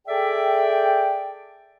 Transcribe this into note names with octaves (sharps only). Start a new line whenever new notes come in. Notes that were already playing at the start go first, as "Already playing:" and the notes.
G#4 A4 D5 E5 G5